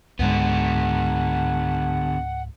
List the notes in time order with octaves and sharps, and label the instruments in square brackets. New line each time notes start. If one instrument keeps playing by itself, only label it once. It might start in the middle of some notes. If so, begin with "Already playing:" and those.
[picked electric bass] C#2 G#2 G#3 [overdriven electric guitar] D3 B3 [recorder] F#5